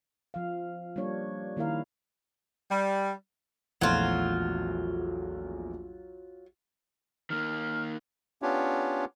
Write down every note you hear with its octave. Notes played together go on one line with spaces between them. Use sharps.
F3 F5
G3 A#3 D4 C#5
D#3 A#3 E4 A#4 F5
G3
A#1 E2 F#3 A3 F4
D#3 A#3 F6
B3 C#4 D4 F4 G4 C#5